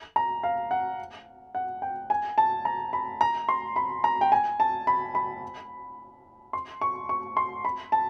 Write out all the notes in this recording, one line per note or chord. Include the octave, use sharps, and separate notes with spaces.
A#5
F5
F#5
F#5
G5
G#5
A5
A#5
B5
A#5
C6
B5
A#5
G5
G#5
A5
B5
B5
C6
C#6
C#6
C6
B5
A5